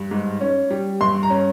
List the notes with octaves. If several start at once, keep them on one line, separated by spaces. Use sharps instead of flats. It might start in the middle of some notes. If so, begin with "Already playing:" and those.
Already playing: G2
G#2
C#4
G3
G2 C6
A#5
C#4